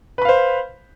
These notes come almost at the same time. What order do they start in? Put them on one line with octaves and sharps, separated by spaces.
B4 B5 F5 C5